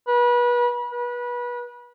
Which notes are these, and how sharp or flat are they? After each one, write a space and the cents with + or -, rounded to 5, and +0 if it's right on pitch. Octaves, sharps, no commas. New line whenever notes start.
B4 -30
B4 -25